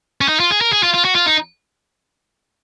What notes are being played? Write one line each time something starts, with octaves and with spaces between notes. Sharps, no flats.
C#4
D#4
F4
G#4
A#4
G#4
F4
F4
F#4
F4
D#4